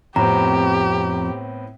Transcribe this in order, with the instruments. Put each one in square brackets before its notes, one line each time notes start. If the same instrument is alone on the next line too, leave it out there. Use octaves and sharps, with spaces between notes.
[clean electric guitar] F2 [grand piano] A2 B3 C4 [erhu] G4 [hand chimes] A#5